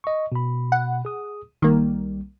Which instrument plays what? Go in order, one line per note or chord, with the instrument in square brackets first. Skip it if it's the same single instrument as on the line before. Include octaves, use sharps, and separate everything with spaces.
[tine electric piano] D#5 C#6
B2 B5
[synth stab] F#5
[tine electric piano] G#4 D#6
[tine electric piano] B1 G3 [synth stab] D#3 A#3